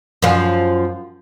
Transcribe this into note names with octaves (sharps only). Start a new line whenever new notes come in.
F#2 F3